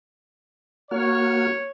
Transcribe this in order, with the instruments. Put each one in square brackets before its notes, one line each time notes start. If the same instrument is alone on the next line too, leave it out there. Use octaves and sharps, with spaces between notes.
[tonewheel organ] A#3 F#4 F6 [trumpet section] C#5